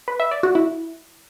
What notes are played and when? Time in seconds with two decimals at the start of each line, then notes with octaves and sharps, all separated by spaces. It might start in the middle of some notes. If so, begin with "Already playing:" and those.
0.08 B4
0.20 E5
0.31 D5
0.43 F#4
0.55 E4